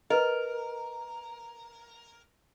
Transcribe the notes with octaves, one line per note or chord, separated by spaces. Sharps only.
A#4 B4 D#5